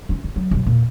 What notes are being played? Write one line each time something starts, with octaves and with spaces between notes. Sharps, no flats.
C#4 F4
F#1
F#3
F#2 B2
E2 A#2